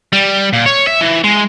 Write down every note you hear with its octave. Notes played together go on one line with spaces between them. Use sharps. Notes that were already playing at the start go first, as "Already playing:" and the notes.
G3
A#2
C#5
E5
E3
G#3